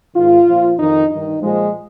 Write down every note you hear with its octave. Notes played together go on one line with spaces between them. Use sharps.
G#2 D#3 F4
A#2 F3
F2 D#3 D#4
G2 D#3 D#4
A#2 F3 G#3